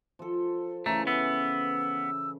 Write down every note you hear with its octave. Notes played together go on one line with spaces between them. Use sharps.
F3 A4
C#3 E3 A3 A#5
B3 E6